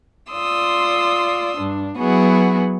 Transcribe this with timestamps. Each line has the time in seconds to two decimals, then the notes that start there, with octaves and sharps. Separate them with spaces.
0.30 F4 D5 C6 D#6 E6
1.58 G2 D4
1.98 F#3 B3 E4 F#4 G#4